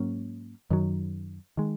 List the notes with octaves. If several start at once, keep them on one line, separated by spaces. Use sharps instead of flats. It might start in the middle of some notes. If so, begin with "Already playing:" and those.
Already playing: G#2 F#3 A#3 C#4
F#2 D#3 F#3
D#3 G#3